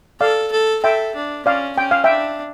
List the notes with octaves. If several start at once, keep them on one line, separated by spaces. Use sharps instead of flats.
A4 D5 F5
A4
A4 E5 G5
D4
C#4 D5 F5
C#4 G5
F5
D4 E5 G5